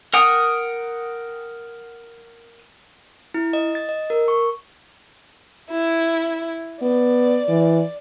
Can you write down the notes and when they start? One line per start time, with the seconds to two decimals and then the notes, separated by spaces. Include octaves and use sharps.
0.14 A#4 F#5 G5 D#6
3.34 E4
3.53 D#5
3.75 A6
3.89 D#5
4.10 A#4
4.28 C#6
5.70 E4
6.82 B3 D5
7.48 E3